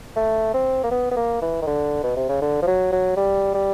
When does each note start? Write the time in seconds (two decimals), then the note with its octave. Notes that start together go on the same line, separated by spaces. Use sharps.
0.16 A3
0.54 C4
0.84 A#3
0.91 B3
1.11 B3
1.17 A#3
1.42 E3
1.62 D#3
1.67 D3
2.04 B2
2.17 C3
2.29 C#3
2.42 D3
2.62 F3
2.67 F#3
2.92 F#3
3.17 G3
3.54 G3